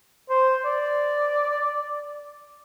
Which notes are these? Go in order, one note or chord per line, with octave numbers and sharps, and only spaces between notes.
C5
D5